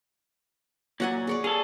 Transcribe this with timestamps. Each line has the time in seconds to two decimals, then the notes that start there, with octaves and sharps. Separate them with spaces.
1.00 A#2 F#3 F#5 G#5
1.27 G#4 C#5 D5
1.44 G#4 A4 F5